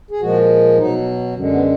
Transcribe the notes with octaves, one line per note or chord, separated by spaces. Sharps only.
G#4
A#2 F3 G#3 F#4
B2 F#3 D#4
F#2 D3 G#3
B3